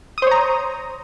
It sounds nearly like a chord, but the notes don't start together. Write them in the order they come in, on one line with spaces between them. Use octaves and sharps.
D#6 C5 C#5 A#5